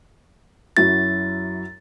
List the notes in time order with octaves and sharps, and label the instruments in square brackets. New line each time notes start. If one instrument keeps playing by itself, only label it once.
[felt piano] F#2 E4 F#4 [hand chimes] A6